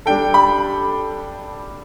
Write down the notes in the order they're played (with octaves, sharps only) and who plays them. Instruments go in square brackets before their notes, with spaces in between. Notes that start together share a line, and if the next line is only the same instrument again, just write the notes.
[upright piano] G3 D4 A4 [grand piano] G5
[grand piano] B5